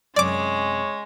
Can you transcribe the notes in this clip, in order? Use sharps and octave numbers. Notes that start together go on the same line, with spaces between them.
F#2 C3 G#3 C#4 C#5 D5 D6